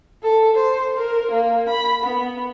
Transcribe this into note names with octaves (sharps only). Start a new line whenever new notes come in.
A4
C5
A#4
A#3
B5
B3